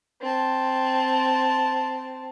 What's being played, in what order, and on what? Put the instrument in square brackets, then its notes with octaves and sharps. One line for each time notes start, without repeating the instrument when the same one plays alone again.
[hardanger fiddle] C4 A5